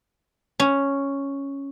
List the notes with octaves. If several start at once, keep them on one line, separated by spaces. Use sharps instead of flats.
C#4